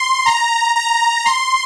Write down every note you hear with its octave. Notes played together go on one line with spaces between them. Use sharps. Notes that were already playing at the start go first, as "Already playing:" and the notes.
Already playing: C6
A#5
A#5
C6